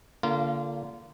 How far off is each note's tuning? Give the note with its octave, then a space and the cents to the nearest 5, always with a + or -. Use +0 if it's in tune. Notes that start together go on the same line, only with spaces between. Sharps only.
D3 -25 A#3 +0 F4 -25